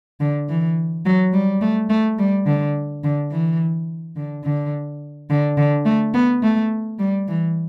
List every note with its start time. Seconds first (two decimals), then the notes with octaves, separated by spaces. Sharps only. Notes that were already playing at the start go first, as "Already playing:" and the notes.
0.20 D3
0.49 E3
1.06 F#3
1.33 G3
1.61 A3
1.89 A3
2.19 G3
2.46 D3
3.04 D3
3.31 E3
4.16 D3
4.44 D3
5.30 D3
5.57 D3
5.85 A3
6.14 B3
6.43 A3
6.99 G3
7.28 E3